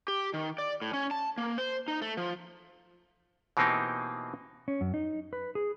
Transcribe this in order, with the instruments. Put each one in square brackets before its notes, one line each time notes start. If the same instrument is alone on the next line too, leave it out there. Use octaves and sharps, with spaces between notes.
[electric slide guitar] G4
D#3
D5
A2
C#4
A5
A#3
C5
D#4
A3
F3
[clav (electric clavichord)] B2 E3 A#3 C4 D#4 G4
[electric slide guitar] C#4
F#2
D#4
B4
G#4